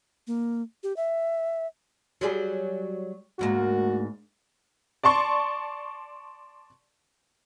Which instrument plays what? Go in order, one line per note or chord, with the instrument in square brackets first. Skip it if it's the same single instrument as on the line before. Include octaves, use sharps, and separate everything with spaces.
[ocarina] A#3
G4
E5
[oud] F#3 G3 G#4
[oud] D2 G#2 A#3 [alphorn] F#4
[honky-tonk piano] D5 A5 C6 C#6